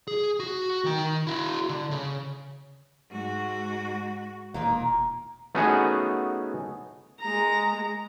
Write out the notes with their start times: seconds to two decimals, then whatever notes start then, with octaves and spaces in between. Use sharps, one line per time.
0.07 G#4
0.40 F#4
0.84 D#3 G5
1.27 E4 F#4
1.69 D3
1.91 C#3
3.10 G#2 F#4
4.54 E1 A#2 D#3 A#3
5.55 A3 B3 C#4 D#4 F#4 G#4
7.21 G#3 A#5